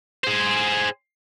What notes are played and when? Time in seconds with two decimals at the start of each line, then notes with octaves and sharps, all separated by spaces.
0.24 G#4 C5